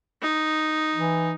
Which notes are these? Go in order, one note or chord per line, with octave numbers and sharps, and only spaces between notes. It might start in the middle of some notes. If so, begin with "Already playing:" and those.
D#4
E3